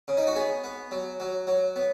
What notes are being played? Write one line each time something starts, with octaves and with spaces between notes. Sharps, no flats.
C#3
D#4
F#4
B3 G#4
B3
F#3
F#3
F#3
B3